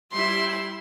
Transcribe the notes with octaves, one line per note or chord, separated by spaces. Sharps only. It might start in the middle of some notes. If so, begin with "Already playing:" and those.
G3 E4 E5 C6